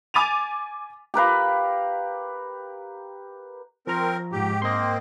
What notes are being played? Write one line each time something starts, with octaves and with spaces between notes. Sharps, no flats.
G#5 D6 A6 D#7 F7
G4 A#4 B4 F5
F3 C4 A#4 A#5
G#2 G4
A#3 C4 D#5 C6